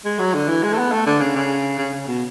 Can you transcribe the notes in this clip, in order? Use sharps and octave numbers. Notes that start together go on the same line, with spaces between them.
G#3
F#3
D3
E3
G#3
A3
B3
A3
D3
C#3
C#3
C#3
C#3
B2